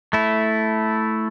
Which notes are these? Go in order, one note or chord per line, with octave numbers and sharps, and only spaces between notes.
A3 E4